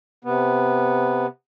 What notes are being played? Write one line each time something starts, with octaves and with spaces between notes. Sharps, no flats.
C3 B3